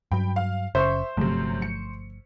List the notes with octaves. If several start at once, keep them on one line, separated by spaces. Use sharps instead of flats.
G2 F#3 G5 B5
F5
F#1 C#3 C5 E5 C#6
G1 F#2 C3 F3 A3
C#7